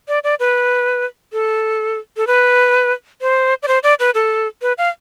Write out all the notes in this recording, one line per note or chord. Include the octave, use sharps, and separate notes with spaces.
D5
D5
B4
A4
A4
B4
C5
D5
C5
D5
B4
A4
B4
F5